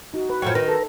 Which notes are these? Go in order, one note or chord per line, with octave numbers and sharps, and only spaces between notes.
D#4 F#4
B4
F#2 A2 F3 G5 C#6 G#6
D#3 D#4 B4 A#5
A4